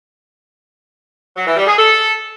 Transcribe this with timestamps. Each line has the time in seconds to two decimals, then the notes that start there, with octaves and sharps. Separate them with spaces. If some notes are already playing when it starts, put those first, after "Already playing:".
1.35 F#3
1.46 E3
1.56 G3
1.67 G#4
1.77 A4